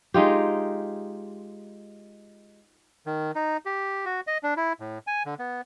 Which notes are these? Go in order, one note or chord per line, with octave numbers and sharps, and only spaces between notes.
G#3 D#4 F4 G4
D#3
D#4
G4
F#4
D#5
D4
E4
A2
G#5
D3
B3